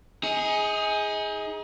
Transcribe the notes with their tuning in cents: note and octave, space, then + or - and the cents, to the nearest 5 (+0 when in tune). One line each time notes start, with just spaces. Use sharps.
D#4 +30 G#4 +0